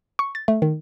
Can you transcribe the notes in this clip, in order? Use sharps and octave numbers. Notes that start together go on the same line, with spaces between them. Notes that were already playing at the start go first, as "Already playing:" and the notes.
C#6
A6
A3
D#3